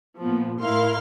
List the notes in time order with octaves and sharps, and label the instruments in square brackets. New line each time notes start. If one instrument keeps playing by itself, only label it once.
[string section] A#2 F3 B3
A2 E4 A#4 F5 C6 F6